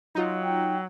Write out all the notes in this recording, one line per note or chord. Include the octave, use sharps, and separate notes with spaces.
F#3 D#4 F4
G5